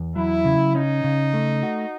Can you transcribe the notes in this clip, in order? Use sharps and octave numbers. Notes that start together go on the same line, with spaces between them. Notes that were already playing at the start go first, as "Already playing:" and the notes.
Already playing: E2
F#3 E4
C#3
C#4 D#4
C#3
A3
F#4